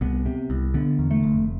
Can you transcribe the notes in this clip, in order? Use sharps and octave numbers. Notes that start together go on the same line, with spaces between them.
C2 B3
C3
C2
D3 B3
E2
A3
F1